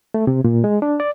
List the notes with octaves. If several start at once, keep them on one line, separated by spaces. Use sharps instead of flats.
A3
C3
A#2
G#3
D4
D5